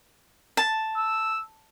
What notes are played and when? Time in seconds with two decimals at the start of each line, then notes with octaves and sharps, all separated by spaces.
0.57 A5
0.97 E6